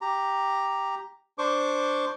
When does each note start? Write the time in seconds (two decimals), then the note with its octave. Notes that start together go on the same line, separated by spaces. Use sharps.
0.01 G4 A#5
1.38 D4 C5 C#6 D6